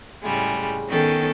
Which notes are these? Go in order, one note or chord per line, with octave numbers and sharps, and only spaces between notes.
A2 C#3 G3 G#3
D#3 B3 C#4 A4 G5